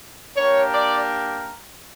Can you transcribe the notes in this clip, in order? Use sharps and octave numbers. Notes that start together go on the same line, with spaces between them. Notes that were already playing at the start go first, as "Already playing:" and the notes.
A#3 D4 G4 A#4 C#5
D5